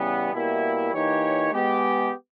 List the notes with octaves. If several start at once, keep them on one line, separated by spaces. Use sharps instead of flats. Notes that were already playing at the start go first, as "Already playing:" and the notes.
Already playing: C#3 E3 G3 B3
B2 G3 A#3 E4
E3 A#3 D#4 G4 C#5
G#3 B3 G4